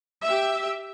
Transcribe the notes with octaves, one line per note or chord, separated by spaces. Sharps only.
G4 E5